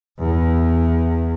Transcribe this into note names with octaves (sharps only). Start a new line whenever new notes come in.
E2